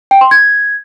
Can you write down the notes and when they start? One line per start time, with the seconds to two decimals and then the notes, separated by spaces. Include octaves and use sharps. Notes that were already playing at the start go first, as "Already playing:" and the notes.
0.11 G5
0.21 C6
0.31 G#6